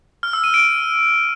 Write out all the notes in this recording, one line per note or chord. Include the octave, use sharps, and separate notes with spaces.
F6
E6
D#7
D7